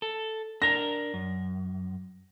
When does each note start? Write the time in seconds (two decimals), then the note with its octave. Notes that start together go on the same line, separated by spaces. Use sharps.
0.02 A4
0.62 D4 A#4 A#6
1.14 F#2